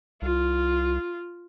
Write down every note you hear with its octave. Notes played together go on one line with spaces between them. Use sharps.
C2 F4